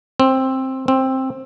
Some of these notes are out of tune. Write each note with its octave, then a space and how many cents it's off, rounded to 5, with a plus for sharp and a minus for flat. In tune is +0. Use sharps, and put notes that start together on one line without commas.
C4 +10
C4 +10